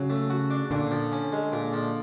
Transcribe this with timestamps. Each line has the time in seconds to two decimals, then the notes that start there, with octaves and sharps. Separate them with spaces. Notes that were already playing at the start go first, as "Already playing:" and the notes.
Already playing: C#3 F#3
0.10 A3
0.30 F#4
0.50 D4
0.71 A#2 D3
0.91 F3
1.12 C#4
1.33 G#3
1.52 A#2
1.73 F3